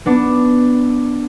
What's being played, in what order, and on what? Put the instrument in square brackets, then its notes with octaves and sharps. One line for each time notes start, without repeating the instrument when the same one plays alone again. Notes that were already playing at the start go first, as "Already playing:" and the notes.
[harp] B3 D4